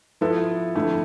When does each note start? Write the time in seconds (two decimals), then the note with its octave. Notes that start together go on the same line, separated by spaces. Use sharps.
0.21 F3 B3 E4 A4
0.75 F2 D3 A3 E4